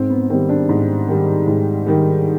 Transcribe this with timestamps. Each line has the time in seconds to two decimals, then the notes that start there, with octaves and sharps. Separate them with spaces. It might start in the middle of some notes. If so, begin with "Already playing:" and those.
Already playing: G#2 C4
0.10 B3
0.30 D#3 G3 C4
0.49 D4
0.69 G#2
1.08 D#3 G3
1.48 G#2
1.86 D#3 G3